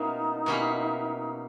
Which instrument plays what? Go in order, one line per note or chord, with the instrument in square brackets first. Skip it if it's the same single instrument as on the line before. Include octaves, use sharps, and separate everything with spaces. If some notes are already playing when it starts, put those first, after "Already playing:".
Already playing: [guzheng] B2 A#3 C#4 E4 [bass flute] D#4
[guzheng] B2 A#3 C#4 E4 G4